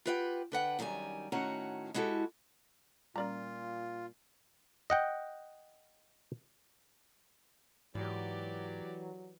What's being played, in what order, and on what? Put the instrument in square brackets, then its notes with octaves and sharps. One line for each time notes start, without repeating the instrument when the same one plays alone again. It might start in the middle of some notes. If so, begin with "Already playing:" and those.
[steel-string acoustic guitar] F4 G4 B4 E5 F#5 G5
D3 B4 F#5 G5
F#2 D#3 G3 A#4 G#5
A2 D#3 C#4 F#4 F#5 A#5
G#3 E4 F#4 G4 A4
[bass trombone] A#2 [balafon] G3 C#4 [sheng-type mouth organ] F4 [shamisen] A#4 D5 A#5
[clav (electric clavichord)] D#5 F#5 G5
[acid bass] G#2 [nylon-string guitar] E3 [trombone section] F#3 [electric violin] G4 D5